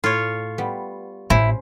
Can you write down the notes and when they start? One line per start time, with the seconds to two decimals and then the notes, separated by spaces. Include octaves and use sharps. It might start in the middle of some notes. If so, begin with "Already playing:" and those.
0.04 A2 F4 C#5
0.58 G3 B3
1.30 A1 C#4 E4 C5 C#5